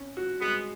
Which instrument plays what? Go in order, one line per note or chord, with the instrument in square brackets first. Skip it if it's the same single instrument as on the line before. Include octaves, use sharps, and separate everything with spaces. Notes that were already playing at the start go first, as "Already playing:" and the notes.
Already playing: [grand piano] C#4
F#4
[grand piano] G#3 [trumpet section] B3